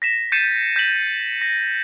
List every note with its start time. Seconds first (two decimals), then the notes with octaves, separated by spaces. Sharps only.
0.02 A#6 B6 E7
0.32 G6 A6 C7 C#7 D#7 E7
0.76 G6 B6 F#7
1.41 A#6